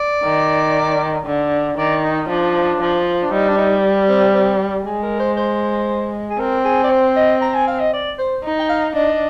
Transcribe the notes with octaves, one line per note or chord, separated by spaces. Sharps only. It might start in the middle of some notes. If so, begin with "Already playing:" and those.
Already playing: D5
D#3
D3
D#3 D5
D#4
F3 D4
F3
D4
G3 D#4
D4
D#4
C4
C4
G#3 G#4
A#4
C5
C5
G#4
C4 A#4
G#4
D5
C5
D#5
A#5
G#5
F5
D#5
D5
C5
D#4
G5
F5
D4 D#5